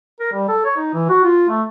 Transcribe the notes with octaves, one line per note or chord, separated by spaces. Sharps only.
A#4
G3
A4
C#5
D#4
E3
F#4
F4
A3